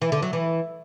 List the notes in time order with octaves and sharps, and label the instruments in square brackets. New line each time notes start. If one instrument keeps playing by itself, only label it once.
[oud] E3
D3
F#3
E3